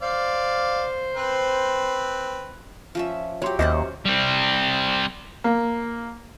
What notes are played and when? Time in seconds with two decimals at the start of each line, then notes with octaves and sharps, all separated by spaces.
0.02 C5 D5 F5
1.16 C4 B4
2.95 F3 C#4 E5
3.42 F#3 G4 C#5 C6
3.59 D#2 C#4 G4 C5 D#5 E5 F#5
4.05 G3 C4
5.44 A#3